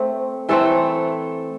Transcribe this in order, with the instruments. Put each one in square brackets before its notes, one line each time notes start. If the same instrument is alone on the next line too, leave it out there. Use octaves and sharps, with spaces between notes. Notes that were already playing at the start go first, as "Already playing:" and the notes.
Already playing: [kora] A3 C4
E3 A3 C4 A4